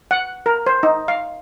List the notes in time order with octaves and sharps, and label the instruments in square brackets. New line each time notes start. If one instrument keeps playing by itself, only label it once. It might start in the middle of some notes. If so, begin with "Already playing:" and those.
[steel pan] F#5
A#4
C5
D#4
F5